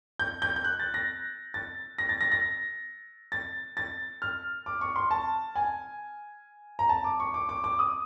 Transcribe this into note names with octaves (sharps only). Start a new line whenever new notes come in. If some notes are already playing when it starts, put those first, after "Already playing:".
G6
G6
G6
F#6
A6
A#6
A6
A#6
A6
A#6
A#6
A6
A6
F6
D6
C#6
C6
A5
G#5
A#5
A5
D6
C#6
D6
D6
D6
D#6